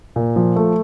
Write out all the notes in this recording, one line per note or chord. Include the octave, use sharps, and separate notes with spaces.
A#2
F3
A3